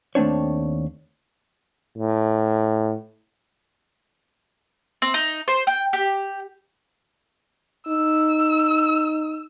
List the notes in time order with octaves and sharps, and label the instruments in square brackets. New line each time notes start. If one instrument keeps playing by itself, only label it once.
[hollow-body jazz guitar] D#2 A3 C4 D4 C#5
[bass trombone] A2
[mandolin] C4
D#4
C5
G5
G4
[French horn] D#4 [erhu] E6